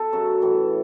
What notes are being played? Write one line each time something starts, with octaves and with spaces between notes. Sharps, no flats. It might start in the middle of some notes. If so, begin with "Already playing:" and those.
Already playing: A4
F#2 C#3 F#3
A2 E3